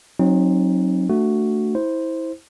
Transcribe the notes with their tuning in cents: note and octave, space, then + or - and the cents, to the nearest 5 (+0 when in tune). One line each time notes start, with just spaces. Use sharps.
F#3 +0 C4 +35 D#4 +0
A3 +15 D4 +0 F#4 +0
E4 -20 C5 +0